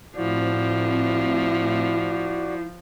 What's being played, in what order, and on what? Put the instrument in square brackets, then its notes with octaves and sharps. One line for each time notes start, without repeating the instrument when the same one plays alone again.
[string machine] A2 C4 [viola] F3 [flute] E4 [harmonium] F#4 D5